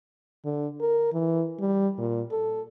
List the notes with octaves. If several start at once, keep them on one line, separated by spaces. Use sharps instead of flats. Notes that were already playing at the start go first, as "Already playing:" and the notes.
D3
A#4
E3
G3
A#2
A4